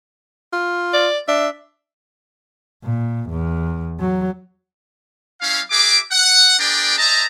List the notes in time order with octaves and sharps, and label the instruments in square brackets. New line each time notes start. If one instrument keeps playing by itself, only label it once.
[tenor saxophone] F4
[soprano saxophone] D5
[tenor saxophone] D4 [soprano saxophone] E5
[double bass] A#2
E2
F#3
[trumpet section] G3 C#4 E4 F5
F#4 G#4 E5 D6
F#5
B3 D4 G#4 A#4 D5 G5
C5 D#5 E5 A5 A#5